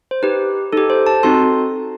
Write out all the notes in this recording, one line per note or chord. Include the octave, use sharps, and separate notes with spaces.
C5
D#4 G4 B4
D#4 G4 A4
C5
A5
C4 D#4 F#4 A4 C6